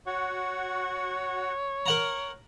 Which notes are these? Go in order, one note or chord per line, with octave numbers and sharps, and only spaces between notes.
F#4 C#5 F#5
A#4 F#5 A#5